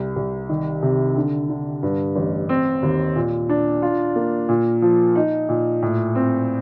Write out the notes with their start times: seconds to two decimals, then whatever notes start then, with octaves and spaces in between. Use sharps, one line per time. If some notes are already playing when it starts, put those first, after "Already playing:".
Already playing: C2
0.16 C2
0.49 D#3
0.82 C3
1.16 D3
1.50 D3
1.83 G2
2.16 A1
2.49 C4
2.83 D#2
3.16 A#2
3.49 D4
3.82 F4
4.16 A#3
4.49 A#2
4.82 F3
5.16 D#4
5.49 A#2
5.82 A2
6.15 C4